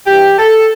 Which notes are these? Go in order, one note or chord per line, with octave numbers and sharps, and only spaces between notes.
G2 E3 G4
A4